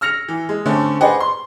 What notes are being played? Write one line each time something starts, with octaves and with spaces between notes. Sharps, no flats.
E6 F6 A#6 C#7 F7
E3
G#3
D3 A3 C4 C#4
G#4 B4 C5 D5 D#5 F#5
C6